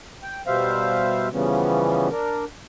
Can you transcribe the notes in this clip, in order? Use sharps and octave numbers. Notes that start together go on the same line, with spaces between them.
G5
B2 G3 C5 E5 F5
C#3 E3 F3 G3 B3 C#4
D4 A#4